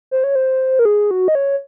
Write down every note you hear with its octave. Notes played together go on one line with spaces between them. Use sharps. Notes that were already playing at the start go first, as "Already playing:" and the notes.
C5
C#5
C5
A#4
G#4
F#4
D#5
C#5